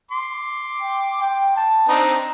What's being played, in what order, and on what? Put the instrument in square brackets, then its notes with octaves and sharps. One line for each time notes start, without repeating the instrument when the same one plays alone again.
[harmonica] C6 D6
[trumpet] G5
G5
A5
[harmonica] C4 D4 D#4 [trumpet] A#5